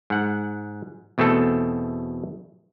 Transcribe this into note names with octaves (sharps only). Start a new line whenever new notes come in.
G#2 F#5
E2 B2 A3 C4 A4